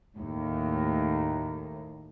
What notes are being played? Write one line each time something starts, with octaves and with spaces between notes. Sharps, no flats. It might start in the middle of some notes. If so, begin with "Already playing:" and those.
D#2 A2